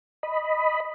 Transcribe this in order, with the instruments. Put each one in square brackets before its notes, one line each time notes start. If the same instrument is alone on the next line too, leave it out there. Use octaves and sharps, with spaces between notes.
[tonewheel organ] D#5 B5